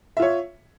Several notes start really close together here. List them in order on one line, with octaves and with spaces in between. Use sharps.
E5 F4 C#5